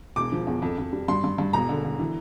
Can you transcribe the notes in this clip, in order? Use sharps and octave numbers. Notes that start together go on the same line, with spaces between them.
E1 D6
F3
E2
F2
F2
G3
G2 C6
G2
G2
E1 A#5
D3
D3
E3